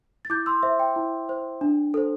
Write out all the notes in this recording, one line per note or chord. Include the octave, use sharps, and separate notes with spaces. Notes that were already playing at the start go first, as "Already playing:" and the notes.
A6
E4 D6 G6
C6 E6
C5 E5
G5
E4
C5
D4
A4 C5